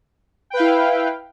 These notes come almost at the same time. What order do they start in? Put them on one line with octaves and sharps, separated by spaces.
G5 B4 F5 E4